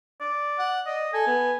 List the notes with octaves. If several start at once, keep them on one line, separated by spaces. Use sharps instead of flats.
D5
F#5
D5 D#5
A4 G#5
B3